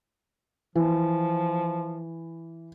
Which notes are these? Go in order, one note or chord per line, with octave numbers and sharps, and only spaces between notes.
E3 F3